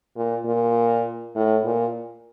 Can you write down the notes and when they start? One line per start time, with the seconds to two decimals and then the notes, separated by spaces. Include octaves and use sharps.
0.16 A#2
0.45 A#2
1.36 A2
1.65 A#2